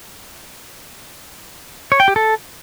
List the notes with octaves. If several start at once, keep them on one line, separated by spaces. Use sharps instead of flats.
C#5
G5
G4
A4